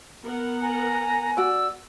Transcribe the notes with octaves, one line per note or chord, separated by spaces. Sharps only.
B3 A#4 F#5
G#5 A#5
F#4 D5 E6